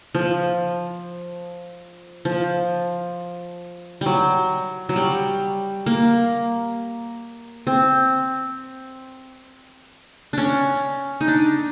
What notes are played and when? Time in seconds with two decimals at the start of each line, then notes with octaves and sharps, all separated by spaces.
0.15 F3
2.25 F3
4.01 F#3 G3
4.89 F#3
4.96 G3
5.86 A#3
7.67 C4
10.33 C#4 D4
11.21 D#4
11.28 D4